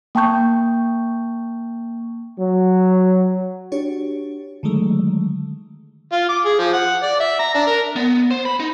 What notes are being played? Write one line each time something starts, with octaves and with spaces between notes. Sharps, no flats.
A#3 G5 A5 C#6 G6
F#3
D4 F#4 G4 C#5
D3 D#3 F#3 G#3 A3
F4
D6
G#4
F3
F#5
D5
E5
A#5
D4
A#4
B3
C5
B5
D#4